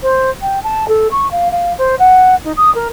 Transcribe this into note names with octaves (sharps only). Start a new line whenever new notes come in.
C5
G5
A5
A4
C#6
F5
F5
C5
F#5
D#4
D#6
A#4